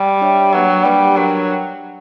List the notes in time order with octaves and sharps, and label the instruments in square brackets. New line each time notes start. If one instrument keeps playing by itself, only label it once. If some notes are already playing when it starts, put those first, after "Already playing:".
Already playing: [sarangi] G3
[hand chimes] D4 G4 C#5 E5
[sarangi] F#3 [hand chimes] A#3 D4 G4 B4 F#5
[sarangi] G3 [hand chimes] A#3 D4 G4 B4 F#5
[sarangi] F#3 [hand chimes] D4 A#4 C#5 G5